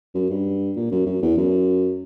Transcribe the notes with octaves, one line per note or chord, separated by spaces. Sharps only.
F#2
G2
A#2
F#2
F#2
E2
F#2